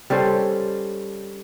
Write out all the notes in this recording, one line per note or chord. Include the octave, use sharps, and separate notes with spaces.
G3 C#4 A4 C5